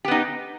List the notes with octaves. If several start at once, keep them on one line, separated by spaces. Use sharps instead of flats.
B3 D#4 G4